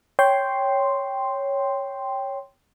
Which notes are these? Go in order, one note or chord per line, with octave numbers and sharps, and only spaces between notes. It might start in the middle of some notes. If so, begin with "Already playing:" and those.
C#5 G5 C6